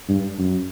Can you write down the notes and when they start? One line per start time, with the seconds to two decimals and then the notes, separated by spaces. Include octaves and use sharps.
0.09 G2
0.38 F#2